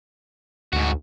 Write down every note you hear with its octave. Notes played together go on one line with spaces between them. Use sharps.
D2 G#2 F#4